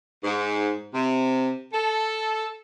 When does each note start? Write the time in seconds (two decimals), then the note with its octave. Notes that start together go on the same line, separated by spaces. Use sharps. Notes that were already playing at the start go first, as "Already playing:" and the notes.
0.23 G#2
0.94 C3
1.74 A4